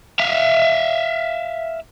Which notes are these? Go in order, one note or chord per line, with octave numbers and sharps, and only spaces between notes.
E5 F5